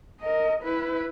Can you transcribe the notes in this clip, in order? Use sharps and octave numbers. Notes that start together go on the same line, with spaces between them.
A#4 D#5
E4 B4